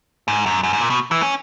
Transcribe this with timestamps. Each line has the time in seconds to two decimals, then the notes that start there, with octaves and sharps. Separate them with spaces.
0.28 G#2
0.46 F#2
0.63 F#2
0.73 G#2
0.81 A#2
0.90 B2
1.11 E3
1.22 C#4